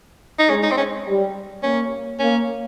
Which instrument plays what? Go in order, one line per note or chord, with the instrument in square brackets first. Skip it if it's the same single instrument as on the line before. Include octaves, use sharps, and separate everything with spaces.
[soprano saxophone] D#4
[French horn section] G#3 [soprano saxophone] C#4
[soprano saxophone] D#4
C4
C#4
[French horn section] G3
[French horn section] A#3 [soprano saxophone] C#4
[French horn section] A#3 [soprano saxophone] C#4